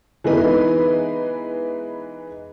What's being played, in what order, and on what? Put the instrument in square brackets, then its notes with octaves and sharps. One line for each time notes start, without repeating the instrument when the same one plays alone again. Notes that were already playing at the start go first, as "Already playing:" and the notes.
[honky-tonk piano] E3 G#3 B3 D#4 B4